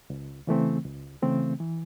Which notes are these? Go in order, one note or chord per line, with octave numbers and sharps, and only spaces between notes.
C#2
C#3 E3 A3 C4
C#2
C#3 E3 A3 C4
E3